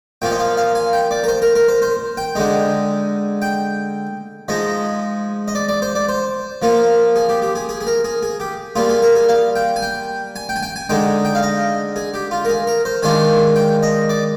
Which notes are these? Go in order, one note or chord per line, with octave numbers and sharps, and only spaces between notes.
A#2 F3 A#3 F4 G5
D#5
F5
F5
G#5
G5
D5
A#4
C5
A#4
A#4
C5
C5
G5
D3 G#3 D#4
G5
F3 G#3 D#4 D#5
D#5
D5
D5
C5
D5
C5
F3 A#3 F4
G#4
G4
G4
G#4
G#4
G#4
A#4
G#4
G#4
G4
G3 A#3 F4 G#4
G#4
A#4
G#4
F5
G5
G#5
G5
G#5
G5
G#5
G5
G#5
D3 G#3 D#4 G5
G5
F5
D#5
G#4
G4
F4
A#4
G#4
A#4
C5
D#3 G#3 D4 F4 G#5
G5
D#5
D5